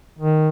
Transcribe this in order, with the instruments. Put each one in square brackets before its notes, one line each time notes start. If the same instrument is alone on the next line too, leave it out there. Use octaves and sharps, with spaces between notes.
[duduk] D#3